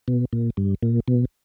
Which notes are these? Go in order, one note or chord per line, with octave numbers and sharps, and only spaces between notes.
B2
A#2
G2
A#2
B2